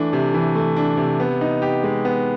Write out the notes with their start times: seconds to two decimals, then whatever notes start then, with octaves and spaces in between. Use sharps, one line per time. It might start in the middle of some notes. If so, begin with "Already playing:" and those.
Already playing: E3 A3 D4
0.13 C3
0.34 E3
0.55 A3
0.76 D4
0.97 C3
1.20 B3
1.41 D#4
1.62 G4
1.84 G#3
2.05 B3